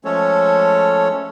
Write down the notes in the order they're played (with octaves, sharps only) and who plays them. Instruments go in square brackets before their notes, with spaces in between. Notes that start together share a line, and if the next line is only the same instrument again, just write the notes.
[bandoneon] F3 G#3 A3 C#4 A4 C#5